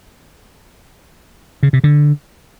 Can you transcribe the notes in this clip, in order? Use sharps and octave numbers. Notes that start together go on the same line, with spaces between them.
C#3
C3
D3